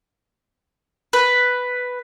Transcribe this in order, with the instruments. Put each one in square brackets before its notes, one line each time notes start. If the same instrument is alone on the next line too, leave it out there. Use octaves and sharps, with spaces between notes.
[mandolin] B4